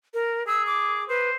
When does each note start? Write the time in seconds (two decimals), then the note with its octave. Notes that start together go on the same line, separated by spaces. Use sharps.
0.14 A#4
0.47 G#4 E6
0.67 D6
1.09 B4 C5